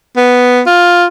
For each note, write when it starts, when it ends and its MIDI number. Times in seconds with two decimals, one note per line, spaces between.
0.17 0.61 59
0.66 1.05 65